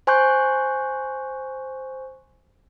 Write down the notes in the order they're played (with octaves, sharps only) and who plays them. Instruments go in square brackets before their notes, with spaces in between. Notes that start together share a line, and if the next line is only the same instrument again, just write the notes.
[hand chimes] C5 G#5 C6 C#6 F#6 G6